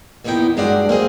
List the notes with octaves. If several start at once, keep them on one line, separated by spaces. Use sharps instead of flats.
E2 A#2 B3 D#4 E4 G5
G2 F#3 G#3 D4 D5 F#5
A#3 C4 G#4 D#5